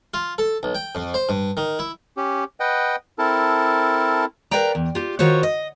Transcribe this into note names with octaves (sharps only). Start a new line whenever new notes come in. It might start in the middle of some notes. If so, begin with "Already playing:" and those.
F4
A4
B1
G5
F2
C5
G2
D#3
E4
C#4 G4
B4 D#5 F#5 G5
C4 E4 A4 A#4 A5
A#4 B4 D5 F5 G5 A#5
E2
F4 G4
D#3 F4 F#4 C5 C#5
D#5